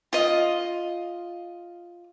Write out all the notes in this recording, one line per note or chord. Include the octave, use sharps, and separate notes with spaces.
F4 D#5